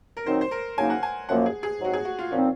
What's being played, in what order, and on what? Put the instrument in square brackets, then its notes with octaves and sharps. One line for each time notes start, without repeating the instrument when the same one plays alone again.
[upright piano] A#4
[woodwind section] D#3 F#3 C4 D#4 [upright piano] C5
[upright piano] C5
A#4
[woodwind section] C#3 F#3 A#3 D#4 [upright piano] G#5
[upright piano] F#5
G#5
[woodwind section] F#2 F3 A#3 [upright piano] F#5
[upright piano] G#4
G#4
[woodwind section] G#2 F#3 C4 [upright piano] F#4
[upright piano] G#4
F#4
F4
[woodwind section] A#2 F3 C4 D#4 [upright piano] C#4